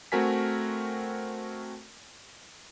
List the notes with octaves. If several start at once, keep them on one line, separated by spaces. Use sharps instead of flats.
A3 C4 F#4 A#4 G#5 B6